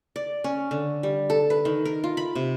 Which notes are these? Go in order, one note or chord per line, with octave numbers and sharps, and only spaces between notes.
D5
C#4
D3
G3
A4
B4
D#3
A#4
F4
B5
C3